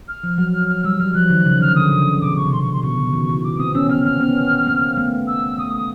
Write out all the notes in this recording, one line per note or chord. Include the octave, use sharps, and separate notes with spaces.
F6
F3
F#3
F6
G3 E6
F#3 F6
F3 F#6
D#3
C#3
D3 F6
D3 D#6
C#3
B2 D6
C#6
C3
B2 C6
C#6
C6
B2 C#6
C#3
D#3
E3
D6
A#3 C4 D#6
B3 C#4 E6
B3 C#4 F6
A#3 C4 F6
B3 C#4
A#3 C4
A3 B3
E6
A3 D#6
D#6